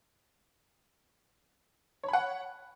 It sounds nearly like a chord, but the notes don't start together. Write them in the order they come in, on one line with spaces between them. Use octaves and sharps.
C#5 B5 F#5